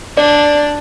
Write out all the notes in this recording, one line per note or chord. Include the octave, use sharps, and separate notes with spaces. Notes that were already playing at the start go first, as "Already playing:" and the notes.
D4 D5